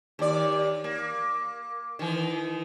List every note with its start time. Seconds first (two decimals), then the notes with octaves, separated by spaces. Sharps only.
0.19 D#2 D5
0.84 A#3
1.99 D#3 E3